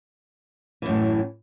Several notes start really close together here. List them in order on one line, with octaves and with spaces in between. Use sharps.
E3 F#2 A2